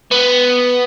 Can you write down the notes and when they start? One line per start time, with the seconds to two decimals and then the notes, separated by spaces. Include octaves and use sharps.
0.11 B3